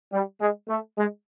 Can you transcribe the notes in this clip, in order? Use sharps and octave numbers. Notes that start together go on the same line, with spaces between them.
G3
G#3
A3
G#3